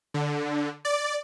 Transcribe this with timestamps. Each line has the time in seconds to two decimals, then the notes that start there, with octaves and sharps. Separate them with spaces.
0.14 D3
0.85 D5